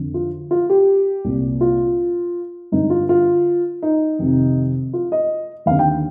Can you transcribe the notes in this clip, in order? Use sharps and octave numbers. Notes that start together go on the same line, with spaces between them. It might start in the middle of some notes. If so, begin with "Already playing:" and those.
Already playing: F2 D3
F4
F4
G4
C2 A#2
F4
G2 D3 D#4
F4
F4
D#4
F2 C3 D#3
F4
D#5
D#2 F5
D3
G5